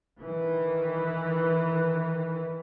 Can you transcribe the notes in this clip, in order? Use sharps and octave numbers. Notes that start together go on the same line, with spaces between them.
D#3 E3